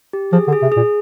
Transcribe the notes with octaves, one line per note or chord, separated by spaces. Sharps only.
G4
F3 G#4
D3
G#4
C3
A#2 G#4